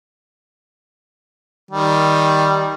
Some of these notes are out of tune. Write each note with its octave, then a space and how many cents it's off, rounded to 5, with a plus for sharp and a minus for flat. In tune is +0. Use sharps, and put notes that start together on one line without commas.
D#3 +5 G3 +0